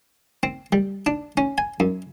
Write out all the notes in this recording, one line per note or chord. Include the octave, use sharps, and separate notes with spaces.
C4
G3
D4
C#4
G#5
F#2